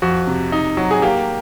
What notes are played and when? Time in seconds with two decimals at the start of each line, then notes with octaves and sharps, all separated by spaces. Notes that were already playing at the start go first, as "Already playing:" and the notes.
0.02 F2 F#4
0.27 C3
0.52 D#4
0.77 F#3
0.91 G#4
1.02 A#3 G4